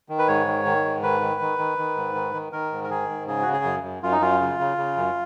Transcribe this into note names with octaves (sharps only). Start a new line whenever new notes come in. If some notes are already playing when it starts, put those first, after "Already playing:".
D#3
B4
G#2 C#5
D#3
D#3
G#2
D#3 B4
D#3
D#3
D#3
D#3
G#2
D#3
D#3
D#3 A#4
G#2
A#4
D#3 G#4
G#2
C#3 G#4
C#3 F#4
G#4
F#2
F#2
F#2 F4
D#4
F#2 F4
C#3
C#3
C#3
F#2